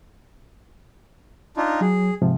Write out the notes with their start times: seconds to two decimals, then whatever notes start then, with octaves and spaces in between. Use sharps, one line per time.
1.57 D4 D#4 F4
1.81 F#3 G#4
2.22 G#2 C3 F3